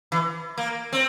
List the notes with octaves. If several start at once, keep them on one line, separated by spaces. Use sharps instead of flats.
E3
A#3
C4